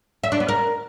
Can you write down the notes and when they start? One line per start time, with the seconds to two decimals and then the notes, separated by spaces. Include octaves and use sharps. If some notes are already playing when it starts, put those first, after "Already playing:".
0.24 E5
0.32 D4
0.40 B3
0.48 A#4